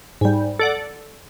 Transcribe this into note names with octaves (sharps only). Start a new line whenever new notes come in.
G#2 G3
A4 D5 F#5